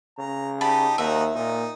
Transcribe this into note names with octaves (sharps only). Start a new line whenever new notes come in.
C#3 A#5
D#4 G4 A5 B5
D#2 D#4 F#4 E5 A#5
A#2 D#4